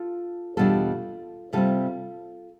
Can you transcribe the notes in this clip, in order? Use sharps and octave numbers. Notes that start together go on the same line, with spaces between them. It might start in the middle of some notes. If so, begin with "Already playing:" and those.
Already playing: F4 A4
E2 B2 G3 D4 F4 A4
C3 G3 C4 F4 A4